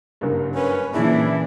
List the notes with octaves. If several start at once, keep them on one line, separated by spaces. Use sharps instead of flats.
F#1 G2
C#4 B4
A#2 C#3 E3 D4 E4